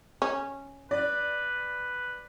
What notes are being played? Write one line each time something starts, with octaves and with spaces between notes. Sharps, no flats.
C#4
B4 D5